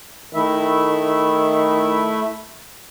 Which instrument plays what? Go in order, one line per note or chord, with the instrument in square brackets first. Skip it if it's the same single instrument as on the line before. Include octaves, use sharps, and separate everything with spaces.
[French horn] D#3 [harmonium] A3 E4 E5